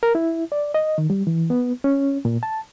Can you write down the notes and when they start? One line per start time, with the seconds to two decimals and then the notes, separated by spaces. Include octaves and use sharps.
0.03 A#4
0.15 E4
0.52 D5
0.74 D#5
0.98 D#3
1.10 G3
1.27 E3
1.50 B3
1.84 C#4
2.25 A#2
2.43 A5